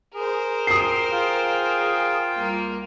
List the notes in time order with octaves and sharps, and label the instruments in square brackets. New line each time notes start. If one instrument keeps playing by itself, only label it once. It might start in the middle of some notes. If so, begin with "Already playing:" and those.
[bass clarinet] G#4 [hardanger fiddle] A#4 C5
[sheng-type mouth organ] G5 C6 [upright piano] D#6 C7
[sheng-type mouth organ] F4 F5 G5 [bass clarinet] G#4
[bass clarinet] C2 [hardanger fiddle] A#3 A#4